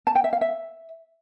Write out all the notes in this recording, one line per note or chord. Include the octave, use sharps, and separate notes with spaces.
A5
G5
E5
F5
E5